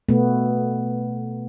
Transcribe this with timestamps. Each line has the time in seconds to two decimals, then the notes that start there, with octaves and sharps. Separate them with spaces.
0.09 B2 A3 B3